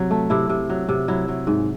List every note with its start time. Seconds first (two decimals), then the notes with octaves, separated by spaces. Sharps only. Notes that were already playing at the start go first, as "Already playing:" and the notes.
Already playing: C3 F#3
0.11 A3
0.30 C3 E4
0.49 C3
0.69 F#3
0.89 C3
1.08 F#3 E4
1.28 F#3
1.47 G#2